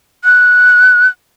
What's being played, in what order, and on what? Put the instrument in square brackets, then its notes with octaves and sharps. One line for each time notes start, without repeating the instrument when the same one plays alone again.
[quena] F#6